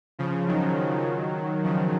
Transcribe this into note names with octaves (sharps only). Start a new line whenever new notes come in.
C#3 F3
D#3 F#3
C#3 F3